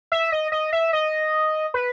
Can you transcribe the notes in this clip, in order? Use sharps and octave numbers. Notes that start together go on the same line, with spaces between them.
E5
D#5
D#5
E5
D#5
B4